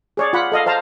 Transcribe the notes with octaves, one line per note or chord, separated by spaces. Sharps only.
G#4 C#5 D5
F4 F#5 B5
A4 D#5 F5
C5 F5 A5 A#5